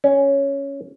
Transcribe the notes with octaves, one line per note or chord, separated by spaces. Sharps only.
C#4